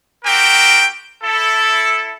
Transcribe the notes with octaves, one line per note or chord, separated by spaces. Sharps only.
C4 F#4 G4 A#4 G5
E4 A4